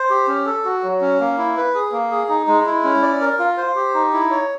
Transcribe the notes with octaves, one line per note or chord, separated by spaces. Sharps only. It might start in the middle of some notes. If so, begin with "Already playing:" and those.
Already playing: C5
G4
C#4
A4
F#4
F#3
C#4
A#3
E4
B4
G#4
A#3
G#4
D#4
G#3
E4
C#4
D5
A#4
F4
C5
G4
D#4
E4
C#5